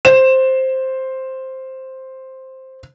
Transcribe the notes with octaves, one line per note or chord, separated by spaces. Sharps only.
C5 E7